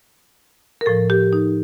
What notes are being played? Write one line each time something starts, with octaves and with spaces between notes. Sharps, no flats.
A#4
A2 F3 A4
G4
D#4